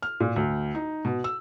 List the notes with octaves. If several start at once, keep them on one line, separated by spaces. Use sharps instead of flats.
F6
A#2
D2
D#4
B2
E6